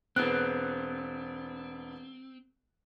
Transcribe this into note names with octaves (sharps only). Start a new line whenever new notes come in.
E1 B3 C4 F#6